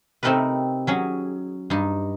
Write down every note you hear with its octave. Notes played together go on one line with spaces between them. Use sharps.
C3 A3 C4 D#4 A#4 B4
F#3 C#4 G#4
G2 D#4